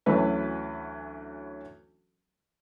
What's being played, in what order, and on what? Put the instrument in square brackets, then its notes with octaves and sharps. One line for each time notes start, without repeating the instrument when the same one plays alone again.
[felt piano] D2 E3 F#3 C#4 B4